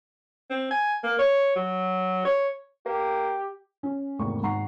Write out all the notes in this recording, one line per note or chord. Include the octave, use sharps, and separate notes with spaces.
C4
G#5
A#3
C#5
F#3
C#5
A#3 G4
C#4
G#1 E2 C3 A3 A#3 C#6
G#1 G#2 F#5 A#5 C#6 C7